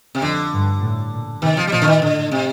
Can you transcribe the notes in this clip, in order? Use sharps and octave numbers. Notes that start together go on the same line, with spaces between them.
C3
F2 D3
G2
A2
A#2
C3 D#3
F3
G3
A#2 F3
D3
D#3
A2 D3
C3